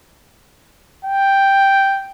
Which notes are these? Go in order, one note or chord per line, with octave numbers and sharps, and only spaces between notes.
G5